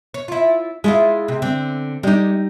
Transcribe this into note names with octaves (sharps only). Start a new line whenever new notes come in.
C#5
E4 F4
G#3 E4 F4 G#4
C3
D3 C4
G3 G#3 D#4 G4